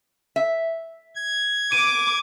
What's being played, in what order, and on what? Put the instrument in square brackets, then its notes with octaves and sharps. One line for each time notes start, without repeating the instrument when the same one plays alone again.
[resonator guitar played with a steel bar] E5
[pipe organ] G#6
[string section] D6 [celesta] D#7